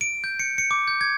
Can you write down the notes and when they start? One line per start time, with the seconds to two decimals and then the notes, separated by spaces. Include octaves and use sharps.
0.01 D7
0.24 G6
0.39 C#7
0.58 C#7
0.71 D6
0.88 G6
1.01 G#6